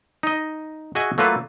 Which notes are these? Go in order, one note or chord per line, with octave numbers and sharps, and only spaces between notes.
D#4 D#5
F#4 G#4 D#5 E5 F#5 G#5
F#3 A3 A#3 F4 A4 B4